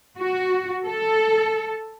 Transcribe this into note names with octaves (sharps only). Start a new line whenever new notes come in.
F#4
A4